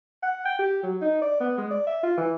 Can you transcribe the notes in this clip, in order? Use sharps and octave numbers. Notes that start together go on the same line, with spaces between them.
F#5
G5
G4
F#3
D#4
D5
B3
G#3
D5
E5
F4
E3